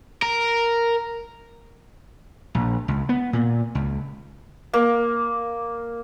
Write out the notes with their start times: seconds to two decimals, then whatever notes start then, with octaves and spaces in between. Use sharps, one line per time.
0.22 A#4
2.55 A#1
2.88 C#2
3.09 B3
3.33 A#2
3.75 C#2
4.73 A#3